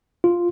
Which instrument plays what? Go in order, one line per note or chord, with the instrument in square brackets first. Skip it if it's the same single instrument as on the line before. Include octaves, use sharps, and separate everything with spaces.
[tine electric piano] F4